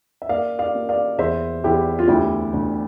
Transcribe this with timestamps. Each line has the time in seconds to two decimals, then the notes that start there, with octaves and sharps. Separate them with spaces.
0.22 E5
0.29 A#3 D5 F5
0.59 D5 F5
0.75 A#3
0.89 D5 F5
1.18 E2 C5 E5
1.64 E2 E4 G4
1.99 F4
2.08 D2 E4 G4
2.54 D2